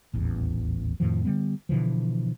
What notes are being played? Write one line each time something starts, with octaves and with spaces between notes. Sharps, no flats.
D#1 A1 E2
F2 A2 D#3 F3
D3 G3 B3
B2 D3 E3 F3